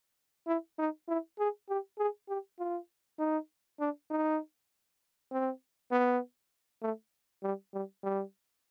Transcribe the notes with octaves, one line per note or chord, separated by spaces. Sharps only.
E4
D#4
E4
G#4
G4
G#4
G4
F4
D#4
D4
D#4
C4
B3
A3
G3
G3
G3